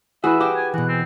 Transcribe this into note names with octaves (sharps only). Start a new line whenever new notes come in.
E3 E4 F#4 G#4 B4 E5
F#4 G4 D6
G#5
B2 E3 F#5
C4